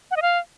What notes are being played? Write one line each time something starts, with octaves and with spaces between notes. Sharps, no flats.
F#5
D#5
F5